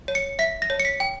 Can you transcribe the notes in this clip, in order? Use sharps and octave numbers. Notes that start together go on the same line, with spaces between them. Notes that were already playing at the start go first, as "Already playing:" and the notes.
C#5
C#7
E5 B6
A#6
C#5
C#7
B6
G5